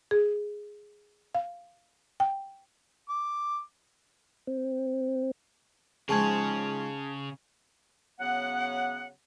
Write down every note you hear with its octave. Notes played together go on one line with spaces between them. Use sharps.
G#4
F5
G5
D6
C4
G#2 C#3 F3 C#4 G#4 A5 G#6
C#3 F#3 B3 F#5